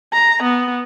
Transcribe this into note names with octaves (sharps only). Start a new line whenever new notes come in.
A#5
B3